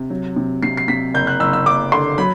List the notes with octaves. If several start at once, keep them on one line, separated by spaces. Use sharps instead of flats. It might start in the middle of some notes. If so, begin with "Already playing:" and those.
Already playing: C3
F#3
C3
C3 C7
C7
C3 B6
F#1 G6
F#6
F#1 E6
E6
F#1 D6
D3 C6
F#3 B5